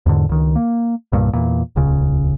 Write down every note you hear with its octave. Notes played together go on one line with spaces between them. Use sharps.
E2 G#2 D3
C#2 D#3
A#3
C2 G2 A#2
E2 A#2
D#1 C#2 C#3